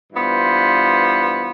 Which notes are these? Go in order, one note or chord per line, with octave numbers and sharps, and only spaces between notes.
G2 E3 B3 F4 C5